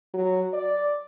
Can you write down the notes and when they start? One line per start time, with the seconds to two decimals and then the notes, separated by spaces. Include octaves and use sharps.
0.14 F#3
0.54 D5